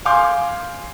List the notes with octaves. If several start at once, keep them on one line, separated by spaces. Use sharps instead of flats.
F5 G#5 C6 D6 G6